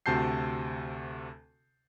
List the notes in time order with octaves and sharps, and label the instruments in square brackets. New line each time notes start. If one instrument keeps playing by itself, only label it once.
[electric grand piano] D2 C3 F#4 A5 G6 C7